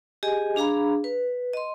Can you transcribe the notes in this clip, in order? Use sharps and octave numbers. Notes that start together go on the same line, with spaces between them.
G4 G#4 D#5 G#5
D4 G#4 F5 A#5 B5
B4
D#5 C6